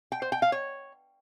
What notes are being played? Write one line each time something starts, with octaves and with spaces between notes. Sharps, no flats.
G5
C5
G5
F5
C#5